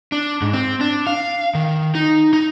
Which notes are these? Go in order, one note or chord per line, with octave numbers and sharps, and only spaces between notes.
D4
G#2
C4
D4
F5
D#3
D#4
D#4